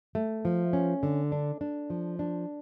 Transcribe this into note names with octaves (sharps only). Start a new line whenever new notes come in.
A3
F3
C#4
D3
D4
D4
F3
D4